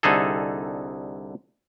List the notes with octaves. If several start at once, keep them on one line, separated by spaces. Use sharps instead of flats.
C2 D3 D#4 G#4 A4